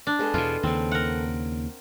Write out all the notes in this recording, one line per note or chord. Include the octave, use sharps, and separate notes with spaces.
D4
G#3 B3 A4
E2 B2 F4
D#2 C#3 C4
A#4 F#5